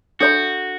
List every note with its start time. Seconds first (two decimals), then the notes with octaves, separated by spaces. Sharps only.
0.20 D4 F#4 A4 C#5 E5 B5